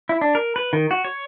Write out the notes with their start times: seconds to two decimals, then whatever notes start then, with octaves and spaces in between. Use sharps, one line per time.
0.09 E4
0.21 D4
0.35 A#4
0.56 B4
0.73 D#3
0.91 F#4
1.05 C#5